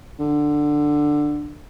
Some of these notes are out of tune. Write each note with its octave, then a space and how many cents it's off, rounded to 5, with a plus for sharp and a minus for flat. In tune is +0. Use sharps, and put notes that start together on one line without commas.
D3 +10